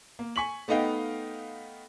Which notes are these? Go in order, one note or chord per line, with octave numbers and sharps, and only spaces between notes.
A#3
G#5 C#6 B6 F#7
A3 B3 D#4 D#5 F5 G5